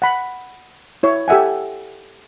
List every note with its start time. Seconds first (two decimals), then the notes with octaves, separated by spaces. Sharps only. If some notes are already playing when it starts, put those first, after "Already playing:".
0.02 F#5 B5
1.03 E4 C#5
1.28 G4 A4 E5 F#5 G#5